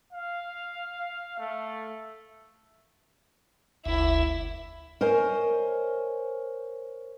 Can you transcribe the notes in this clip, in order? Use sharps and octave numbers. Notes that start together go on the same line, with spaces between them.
F5
A3
F#1 D2 E4 E5
A#4 C5 C#5 D#5 G#5